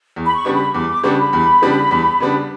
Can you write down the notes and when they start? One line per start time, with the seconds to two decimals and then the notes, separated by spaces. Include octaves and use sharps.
0.16 E2
0.27 B5
0.35 C#6
0.45 C#3 G3 B3 D4
0.54 B5
0.74 E2 D6
0.89 D6
1.03 C#3 G3 B3 D4 C#6
1.18 B5
1.33 E2
1.62 C#3 G3 B3 D4
1.91 E2
2.20 C#3 G3 B3 D4